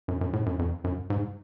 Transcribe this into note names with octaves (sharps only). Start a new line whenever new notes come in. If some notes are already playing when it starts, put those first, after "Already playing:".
F#2
F#2
A2
F#2
F2
F#2
G#2